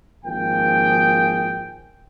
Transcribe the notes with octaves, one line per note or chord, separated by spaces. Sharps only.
G#1 F3 A#3 G#4 G5